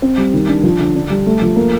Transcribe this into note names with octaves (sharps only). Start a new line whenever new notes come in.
C4
G3
D#3
D4
F3
D3
D4
G3
A3
F3
A#3